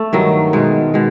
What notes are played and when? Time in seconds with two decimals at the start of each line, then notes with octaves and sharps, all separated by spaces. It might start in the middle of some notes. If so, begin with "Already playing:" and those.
Already playing: A3
0.13 G2 D#3 F#3
0.53 B2 G#3
0.94 B2 G#3